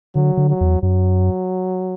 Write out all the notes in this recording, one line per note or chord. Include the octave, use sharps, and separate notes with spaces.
D3 F#3
D3
F#3
E2
F#2 F#3